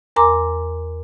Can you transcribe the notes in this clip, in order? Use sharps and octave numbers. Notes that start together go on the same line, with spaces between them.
E2 A#4 G#5 A#5 C6 D6